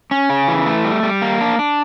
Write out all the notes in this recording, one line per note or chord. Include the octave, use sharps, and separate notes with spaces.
C#4
C#3
E3
A3
G3
G3
A#3
D4
D4